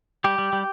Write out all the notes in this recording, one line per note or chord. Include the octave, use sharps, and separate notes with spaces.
G3 G4
G3
G3